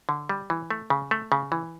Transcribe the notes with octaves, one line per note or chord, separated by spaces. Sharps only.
D3
G3
E3
A3
C#3
A3
C#3
E3